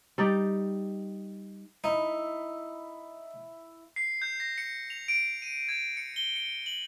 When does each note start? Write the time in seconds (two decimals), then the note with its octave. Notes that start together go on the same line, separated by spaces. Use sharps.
0.18 G3 D#4 D5
1.84 D#4 E4
3.96 C7
4.22 G6
4.40 A#6
4.58 C#7
4.90 F7
5.08 D7
5.42 D#7
5.69 G#6
5.97 C#7
6.16 G7
6.36 C#7
6.66 F#7